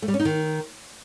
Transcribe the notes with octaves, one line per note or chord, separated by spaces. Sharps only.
A3
G3
C#4
D#4
D#3